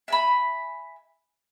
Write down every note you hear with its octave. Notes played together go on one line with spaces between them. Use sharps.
E5 G#5 B5